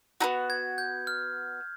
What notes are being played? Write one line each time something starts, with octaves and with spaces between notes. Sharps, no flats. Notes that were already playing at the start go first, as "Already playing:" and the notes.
B3 D#4 F#4
G#6
G6
F6